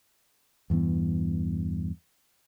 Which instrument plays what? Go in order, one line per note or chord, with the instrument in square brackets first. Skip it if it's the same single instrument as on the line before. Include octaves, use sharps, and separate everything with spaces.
[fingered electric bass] E2 G2 E3 B3